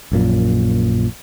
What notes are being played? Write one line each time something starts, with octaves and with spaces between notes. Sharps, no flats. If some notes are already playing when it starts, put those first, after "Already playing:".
A#1 F#2 A#2